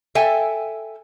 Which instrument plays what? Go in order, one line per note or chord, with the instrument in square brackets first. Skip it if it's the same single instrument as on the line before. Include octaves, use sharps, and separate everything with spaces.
[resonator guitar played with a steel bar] A4 E5 G5 G#5